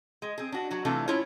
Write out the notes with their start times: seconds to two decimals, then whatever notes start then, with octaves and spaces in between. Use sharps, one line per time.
0.22 G#3
0.38 C4 G#4
0.52 D4 F#4
0.70 F#3 F#4
0.85 C3 E3 A3 D4 F4 A4
1.08 C#4 E4 F4 C#5